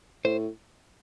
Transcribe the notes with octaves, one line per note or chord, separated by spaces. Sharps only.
A2 C5